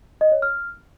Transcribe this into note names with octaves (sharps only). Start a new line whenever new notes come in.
D#5
C#5
F6